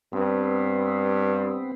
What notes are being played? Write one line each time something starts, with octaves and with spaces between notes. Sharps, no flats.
G2 B3 C4